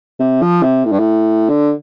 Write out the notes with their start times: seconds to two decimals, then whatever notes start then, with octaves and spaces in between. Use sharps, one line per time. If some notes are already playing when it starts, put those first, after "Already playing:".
0.20 C3
0.42 F3
0.63 C3
0.85 A2
0.92 G2
0.99 A2
1.49 D3